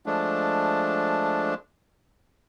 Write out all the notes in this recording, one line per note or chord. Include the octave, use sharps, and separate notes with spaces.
F3 G#3 A3 D4